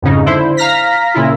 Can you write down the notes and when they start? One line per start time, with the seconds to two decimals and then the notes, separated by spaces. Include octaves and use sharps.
0.02 F2 G#2 C#3 D#4
0.26 D3 E4 C5
0.57 F5 A#5 F6 A#6 B6
1.14 A#2 C#3 E4 F4